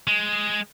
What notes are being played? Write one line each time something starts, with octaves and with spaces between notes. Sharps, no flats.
G#3